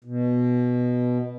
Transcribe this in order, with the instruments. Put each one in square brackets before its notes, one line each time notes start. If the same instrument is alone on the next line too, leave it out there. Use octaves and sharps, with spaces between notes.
[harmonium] B2